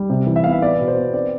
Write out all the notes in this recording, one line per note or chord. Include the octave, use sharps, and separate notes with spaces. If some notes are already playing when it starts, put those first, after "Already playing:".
Already playing: G3
C3
E3
E5
B3 F5
E5
B3 D5
B2
C5
B3
C4 D5